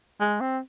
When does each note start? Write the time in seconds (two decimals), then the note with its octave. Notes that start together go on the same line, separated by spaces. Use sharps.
0.20 G#3
0.40 C4